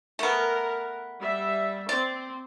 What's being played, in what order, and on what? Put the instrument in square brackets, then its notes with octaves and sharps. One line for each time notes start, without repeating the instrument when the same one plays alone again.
[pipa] A3 B3 [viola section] A#4
[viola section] G3 E5
[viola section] C4 [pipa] D5